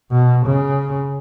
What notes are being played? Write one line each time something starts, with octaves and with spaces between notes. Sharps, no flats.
B2
C#3